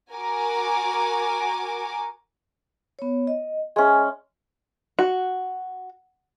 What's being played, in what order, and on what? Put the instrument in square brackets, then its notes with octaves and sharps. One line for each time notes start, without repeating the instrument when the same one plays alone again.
[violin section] F#4 A#4 G#5 D6
[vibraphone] B3 C#5
D#5
[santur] G#3 C#4 [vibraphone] G#4 E5
[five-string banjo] F#4